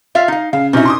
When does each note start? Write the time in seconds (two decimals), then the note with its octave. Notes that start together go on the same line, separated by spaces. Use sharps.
0.15 F4 E5 F5
0.28 D#4 F5
0.53 C#3 F5
0.73 C3 C#4 D#4 E4 F#4
0.85 C6 D6 D#6